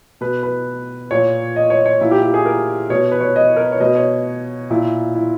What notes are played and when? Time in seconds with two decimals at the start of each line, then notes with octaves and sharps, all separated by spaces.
0.21 B2 B4
0.43 B4
1.11 A#2 C#5
1.56 D#5
1.70 C#5
1.86 C#5
2.01 A#2 E4
2.11 G4
2.23 G4
2.34 G#4
2.46 A#4
2.90 B2 C#5
3.12 B4
3.21 C#5
3.36 D#5
3.56 A#4
3.64 B4
3.72 C#5
3.80 B2 D#5
3.95 C#5
4.70 A#2 E4
5.15 E4